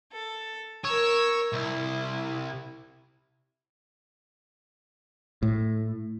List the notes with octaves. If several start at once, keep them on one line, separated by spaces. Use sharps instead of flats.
A4
A#4 C#5 E6
C2 E4
A2